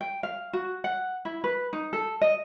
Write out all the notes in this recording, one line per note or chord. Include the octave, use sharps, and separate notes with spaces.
G5
F5
F#4
F#5
E4
B4
D#4
A4
D#5